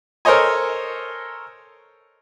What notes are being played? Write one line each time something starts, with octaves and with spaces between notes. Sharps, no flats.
A4 A#4 C5 C#5 D#5 G#5